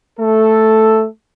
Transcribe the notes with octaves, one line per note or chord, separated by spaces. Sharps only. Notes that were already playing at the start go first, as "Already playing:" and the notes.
A3 A4